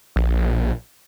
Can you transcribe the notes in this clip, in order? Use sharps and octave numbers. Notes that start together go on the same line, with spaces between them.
A#1